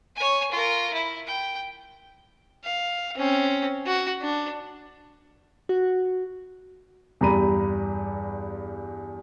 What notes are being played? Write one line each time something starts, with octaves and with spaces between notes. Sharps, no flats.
C#5 G#5
F4 A#4
E4
G5
F5
C4 C#4
F#4
D4
F#4
E2 G2 G4 A#5 B5 D#7